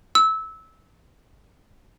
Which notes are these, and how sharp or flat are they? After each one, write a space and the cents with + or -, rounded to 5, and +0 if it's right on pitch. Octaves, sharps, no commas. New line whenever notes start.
E6 -20